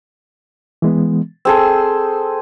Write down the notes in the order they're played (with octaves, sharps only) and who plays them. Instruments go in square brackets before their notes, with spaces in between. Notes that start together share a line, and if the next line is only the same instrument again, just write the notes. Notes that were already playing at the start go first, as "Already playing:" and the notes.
[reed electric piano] E3 G#3 B3
[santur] C4 G#4 A4 [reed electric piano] E6